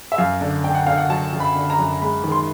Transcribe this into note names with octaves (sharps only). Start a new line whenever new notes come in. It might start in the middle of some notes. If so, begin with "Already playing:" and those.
E5
F#2 F5
D3
D3 G5
F#5
D3 F5
F#5
F#3 A5
F#2
B5
D3
A#5
F#2
G#3 B5
D#3
C6